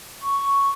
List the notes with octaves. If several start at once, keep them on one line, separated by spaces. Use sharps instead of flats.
C#6